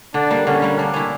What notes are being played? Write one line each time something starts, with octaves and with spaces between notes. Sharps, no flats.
D3 D4
G3 A#3
D3 C#4
G3 A#3
A#3 D4
C#4 E4